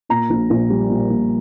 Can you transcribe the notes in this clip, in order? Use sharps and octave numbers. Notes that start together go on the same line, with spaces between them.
A#2 A#5
A#1
A#1
G3
A#2
A#1